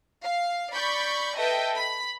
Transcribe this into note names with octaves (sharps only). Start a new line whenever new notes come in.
F5
D5 B5 C#6 G6
A4 B4 D#5 E5 G5
B5